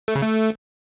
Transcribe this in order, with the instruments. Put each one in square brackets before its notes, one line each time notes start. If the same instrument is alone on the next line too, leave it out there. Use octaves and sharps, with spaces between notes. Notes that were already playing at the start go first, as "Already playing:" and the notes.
[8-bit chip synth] A3
C#3
A3